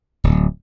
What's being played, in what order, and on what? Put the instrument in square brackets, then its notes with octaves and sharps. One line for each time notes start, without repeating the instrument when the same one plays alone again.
[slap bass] D1